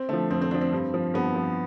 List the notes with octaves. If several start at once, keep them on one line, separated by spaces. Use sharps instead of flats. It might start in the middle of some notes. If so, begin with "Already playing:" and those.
Already playing: C4
D3 F3 A3
F2 C4
C4
D3 F3 D4
C4
G2
F3
G2 B3
F3